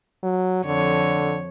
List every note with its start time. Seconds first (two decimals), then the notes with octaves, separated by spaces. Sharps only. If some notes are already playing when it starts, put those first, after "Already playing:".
0.23 F#3
0.65 F2 D3 C#5